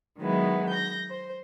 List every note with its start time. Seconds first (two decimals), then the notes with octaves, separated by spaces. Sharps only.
0.18 D#3 F#3 G#3 B3 E4
0.69 G6 A#6
1.09 C5